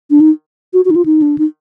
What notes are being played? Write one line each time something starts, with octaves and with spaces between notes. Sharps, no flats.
D4
D#4
F#4
F#4
D#4
F4
D#4
D4
D#4